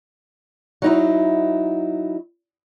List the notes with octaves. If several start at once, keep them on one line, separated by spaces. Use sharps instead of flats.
F#3 D#4 E4